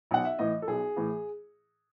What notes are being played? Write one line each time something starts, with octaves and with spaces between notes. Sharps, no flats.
B1 F#5
E5
A2 E3 D#5
A4
B1 G#4
A2 E3